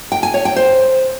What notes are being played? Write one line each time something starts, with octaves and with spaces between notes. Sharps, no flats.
G5
G#5
C#5
G5
C5